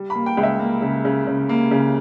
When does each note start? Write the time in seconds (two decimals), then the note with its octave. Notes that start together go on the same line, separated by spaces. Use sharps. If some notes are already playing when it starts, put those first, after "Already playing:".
Already playing: G3
0.10 B5
0.15 A#3
0.26 G5
0.37 C#2
0.43 E5
0.59 A#3
0.82 C#3
1.05 C#3
1.27 C#3
1.49 A#3
1.71 C#3